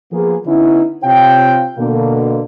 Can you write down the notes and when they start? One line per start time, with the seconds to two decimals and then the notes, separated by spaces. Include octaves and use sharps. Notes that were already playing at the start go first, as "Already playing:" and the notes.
0.12 F3 A#3 B3 F4 G#4
0.46 D3 B3 C#4 D#4 E4
1.04 C3 C4 F4 C#5 F5 G5
1.78 B2 D3 A#3